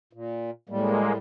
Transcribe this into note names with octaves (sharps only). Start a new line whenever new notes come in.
A#2
A2 G3 G#3 A#3